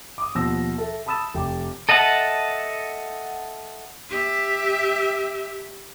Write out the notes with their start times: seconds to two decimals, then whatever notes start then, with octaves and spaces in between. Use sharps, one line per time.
0.18 D6 D#6
0.35 D#2 B2 F3 E6 A#6
0.78 A4 E5
1.06 A5 B5 D#6 E6 A6 E7
1.34 F1 G5 D6
1.89 A4 D#5 E5 F#5 A5
4.10 G4 E5